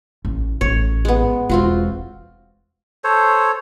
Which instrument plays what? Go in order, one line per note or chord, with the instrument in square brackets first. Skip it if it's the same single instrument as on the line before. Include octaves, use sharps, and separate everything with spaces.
[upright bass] A1
[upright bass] A1 A2 [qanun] C#5
[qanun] G#3 B3
[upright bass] E1 [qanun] C4 F4 F#4
[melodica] A4 C5 C#5